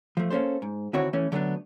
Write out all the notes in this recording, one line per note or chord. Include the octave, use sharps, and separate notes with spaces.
F3 A3
A#3 C#4 D4 A4 C5
G#2
D3 D#3 C4 E4 F#4 C#5
E3 A3 C#4
D3 F#3 G3 A3 B3 D4